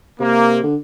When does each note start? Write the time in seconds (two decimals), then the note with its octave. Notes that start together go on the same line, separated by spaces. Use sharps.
0.19 C3 A#3
0.63 D3